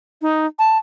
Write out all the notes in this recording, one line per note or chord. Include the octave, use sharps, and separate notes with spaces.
D#4
A5